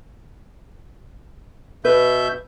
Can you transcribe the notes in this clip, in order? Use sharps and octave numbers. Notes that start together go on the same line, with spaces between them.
B2 B4 E5 G6